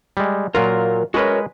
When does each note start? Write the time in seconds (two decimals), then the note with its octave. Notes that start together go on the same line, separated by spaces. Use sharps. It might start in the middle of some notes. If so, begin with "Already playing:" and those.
0.17 G3 G#3
0.55 A#2 F#3 F4 A#4
1.14 G#3 F#4 A#4 B4 C#5